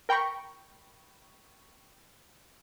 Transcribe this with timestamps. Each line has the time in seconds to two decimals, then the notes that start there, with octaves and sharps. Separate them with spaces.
0.09 A#4 G5 A#5 B5 C#6